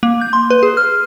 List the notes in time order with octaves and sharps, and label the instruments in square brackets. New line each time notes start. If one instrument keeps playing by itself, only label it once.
[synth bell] A#3
G6
C6
B4
G#4
F6